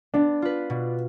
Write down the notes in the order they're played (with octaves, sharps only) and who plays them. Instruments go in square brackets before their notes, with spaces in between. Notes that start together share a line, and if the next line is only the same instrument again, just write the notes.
[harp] B3 [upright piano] D4
[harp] F4 B4
B2